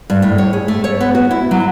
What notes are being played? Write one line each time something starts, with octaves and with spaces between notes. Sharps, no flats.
G2
A2
C#5
G#4
A3
C#5
B3
F#4
E4
F#3